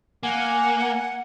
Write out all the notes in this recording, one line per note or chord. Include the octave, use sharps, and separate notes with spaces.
A#3 F#5 G#5